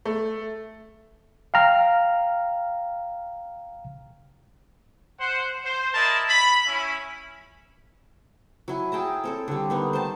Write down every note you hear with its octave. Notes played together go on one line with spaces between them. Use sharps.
A3
F5 G5 A#5 F6
C5 F#5
C5
E4 A#4 D5 D#5 A5
B5
C#4 E4
F#3 E4 G#5
G#4 G5 A5 A#5
C4 A4 C#5
D3 G3
D#3 B3 D#4
C5 A5